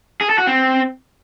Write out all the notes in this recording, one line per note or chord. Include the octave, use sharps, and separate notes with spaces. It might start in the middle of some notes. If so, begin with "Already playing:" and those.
G#4
A4
F#4
C4